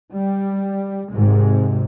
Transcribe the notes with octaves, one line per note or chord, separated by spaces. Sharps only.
G3
G#1 G#2 C3 G#3